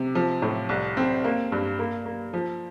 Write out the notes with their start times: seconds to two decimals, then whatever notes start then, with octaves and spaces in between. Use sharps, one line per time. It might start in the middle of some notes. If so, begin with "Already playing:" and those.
Already playing: C3
0.15 F3
0.42 A2
0.69 C2
0.97 C4
1.24 A#3
1.52 G2
1.79 A#3
2.05 A#3
2.34 F3